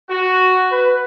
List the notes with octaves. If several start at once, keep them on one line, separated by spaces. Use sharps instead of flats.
F#4
B4